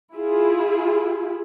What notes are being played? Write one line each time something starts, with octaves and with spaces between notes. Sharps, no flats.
E4 F4 G#4